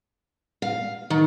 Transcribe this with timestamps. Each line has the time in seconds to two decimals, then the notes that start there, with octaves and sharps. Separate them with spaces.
0.62 F5
1.10 D#3